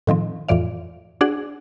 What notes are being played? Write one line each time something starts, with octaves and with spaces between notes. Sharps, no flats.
A2 D#3 F3 C4
F2 A2 E3 D5 F5
D4 F#4 G#4 D5 F#5